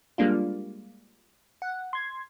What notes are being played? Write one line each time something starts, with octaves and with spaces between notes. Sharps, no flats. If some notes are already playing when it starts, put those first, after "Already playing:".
G3 G#3 A#3 D4 F4
F#5
C6 G#6